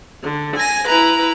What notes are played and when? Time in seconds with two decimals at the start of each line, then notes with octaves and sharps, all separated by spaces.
0.24 D3
0.56 G#5 A#6
0.87 E4 B4 A#5